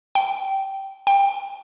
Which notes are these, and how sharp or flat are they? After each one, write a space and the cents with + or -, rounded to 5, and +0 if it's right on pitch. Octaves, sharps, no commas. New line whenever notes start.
G5 -15
G5 +20